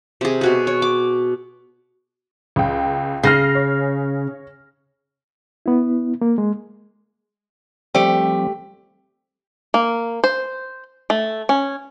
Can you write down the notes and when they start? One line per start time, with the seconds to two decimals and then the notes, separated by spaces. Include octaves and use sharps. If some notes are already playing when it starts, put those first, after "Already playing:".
0.21 C3 G#4
0.41 B2 F#4 G#4
0.67 C#5
0.82 D6
2.56 C#2 G5
3.24 C#3 F6 A#6 C7
3.55 C#5
5.66 B3 E4
6.21 A#3
6.38 G#3
7.95 F3 G3 A3 C4 G4
9.74 A#3
10.24 C5
11.10 A3
11.49 C#4